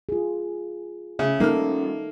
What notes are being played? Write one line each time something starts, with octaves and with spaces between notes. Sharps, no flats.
F4 G#4
C#3 E5
G3 A#3 C4 C#4 D#4 A4 F6